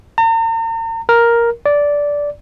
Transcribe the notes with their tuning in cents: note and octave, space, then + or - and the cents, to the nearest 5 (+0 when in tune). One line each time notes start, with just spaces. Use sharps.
A#5 -45
A#4 +5
D5 -10